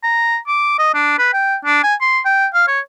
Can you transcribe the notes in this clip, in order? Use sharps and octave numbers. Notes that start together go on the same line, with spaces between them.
A#5
D6
D#5
D4
B4
G5
D4
G#5
C6
G5
F5
C#5